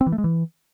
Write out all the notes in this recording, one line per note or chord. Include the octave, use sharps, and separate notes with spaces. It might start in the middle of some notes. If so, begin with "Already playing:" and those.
C4
E3
A3
G#3
E3